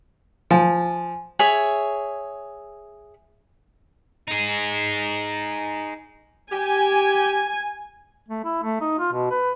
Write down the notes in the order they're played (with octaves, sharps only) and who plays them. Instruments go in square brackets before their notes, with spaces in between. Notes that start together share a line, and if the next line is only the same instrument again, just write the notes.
[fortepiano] F3 [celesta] G#5
[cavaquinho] G#4 C#5 E5
[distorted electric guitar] D#4 G#4
[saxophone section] G4 [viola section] G#5
[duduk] A3
E4
A3
D#4
F4
B2
B4